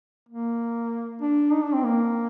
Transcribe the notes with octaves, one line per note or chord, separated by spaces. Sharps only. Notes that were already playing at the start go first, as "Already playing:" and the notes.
A#3
D4
D#4
D4
C4
A#3